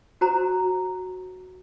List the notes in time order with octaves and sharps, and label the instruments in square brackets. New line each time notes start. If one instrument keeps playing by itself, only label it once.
[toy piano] F#4 C5 A#5